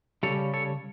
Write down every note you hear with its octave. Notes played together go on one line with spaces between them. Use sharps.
C#3 G3 C#4 A4 C#5
A4 C#5